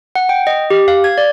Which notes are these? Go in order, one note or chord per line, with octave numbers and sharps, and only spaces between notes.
F#5
G5
D#5
G4
F5
G#6
D5